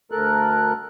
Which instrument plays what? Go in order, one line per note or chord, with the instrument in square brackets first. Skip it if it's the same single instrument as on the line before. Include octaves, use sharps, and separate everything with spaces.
[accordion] D2 A4 A#4 F#6